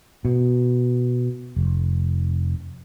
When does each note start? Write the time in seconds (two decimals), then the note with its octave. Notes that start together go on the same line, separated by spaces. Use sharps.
0.25 B2
1.56 F1